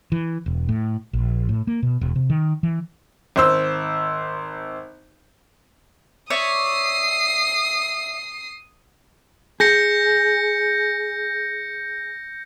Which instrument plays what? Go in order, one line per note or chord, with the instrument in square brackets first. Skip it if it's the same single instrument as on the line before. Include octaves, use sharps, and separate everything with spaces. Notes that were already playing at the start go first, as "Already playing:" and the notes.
[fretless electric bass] E3
E1
A2
A#1
A2
A#3
B2
E1
C3
D#3
E3
[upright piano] G#1 C5 E6
[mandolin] C#5 D5 E5 [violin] D#6 C7
[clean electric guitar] G#4 [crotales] G6 A#6 C#7